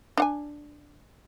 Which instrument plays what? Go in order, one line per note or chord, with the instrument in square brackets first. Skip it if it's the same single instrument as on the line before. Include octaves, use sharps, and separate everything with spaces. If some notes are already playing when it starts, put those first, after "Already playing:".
[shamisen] D4 F#5 G#5